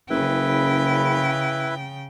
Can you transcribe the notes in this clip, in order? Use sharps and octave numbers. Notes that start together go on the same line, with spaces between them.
F#1 C#3 E4 B4 G5